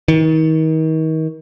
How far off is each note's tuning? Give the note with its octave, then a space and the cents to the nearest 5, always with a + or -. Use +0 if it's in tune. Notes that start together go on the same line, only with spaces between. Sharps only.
D#3 +35